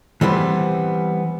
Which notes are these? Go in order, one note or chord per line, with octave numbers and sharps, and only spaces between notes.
E3 G3 B3 C4